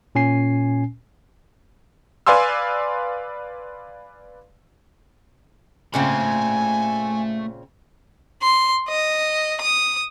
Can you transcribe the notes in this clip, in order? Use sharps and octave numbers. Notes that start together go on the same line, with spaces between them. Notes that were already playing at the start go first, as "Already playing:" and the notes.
A#2 C#4 G#5 C7
B4 D5 F5 G#5 C6 E6
A#2 C#3 A3 C4 G#5 B5
C6
D#5
D#6